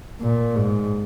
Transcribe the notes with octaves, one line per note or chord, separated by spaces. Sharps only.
A#2
G#2